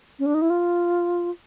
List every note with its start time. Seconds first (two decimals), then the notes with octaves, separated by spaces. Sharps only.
0.19 C#4
0.26 D4
0.34 D#4
0.42 E4
0.50 F4